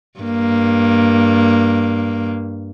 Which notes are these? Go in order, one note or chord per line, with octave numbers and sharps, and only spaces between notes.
G2 A#3